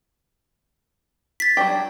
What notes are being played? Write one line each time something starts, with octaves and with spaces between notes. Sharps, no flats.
A6 B6
F#3 D4 G4